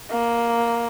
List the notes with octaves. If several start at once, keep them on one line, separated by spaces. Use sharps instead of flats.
A#3